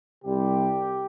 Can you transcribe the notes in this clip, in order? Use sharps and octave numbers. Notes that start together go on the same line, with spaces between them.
C2 C3 G3 C4 G4